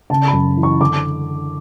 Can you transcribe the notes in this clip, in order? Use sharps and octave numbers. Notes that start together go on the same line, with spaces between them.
C#3 A5
B5
F#2
E3
C#6
D3 D6